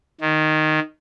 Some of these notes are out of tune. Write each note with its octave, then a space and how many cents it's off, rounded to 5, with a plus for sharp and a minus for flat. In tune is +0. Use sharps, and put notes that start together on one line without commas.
D#3 -5